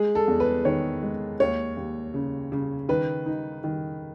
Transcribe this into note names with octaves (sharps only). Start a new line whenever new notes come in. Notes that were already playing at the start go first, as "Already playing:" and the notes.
Already playing: G#3 G#4
A4
E2
B4
D#3 C#5
G#3
D#2 C#5
D#2
C#3
C#3
D#3 B4
D#4
D#3